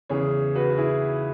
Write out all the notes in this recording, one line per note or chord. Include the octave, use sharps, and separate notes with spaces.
E2 C#3 E3 G#4 C#5
F#4 B4
F#4
E4 G#4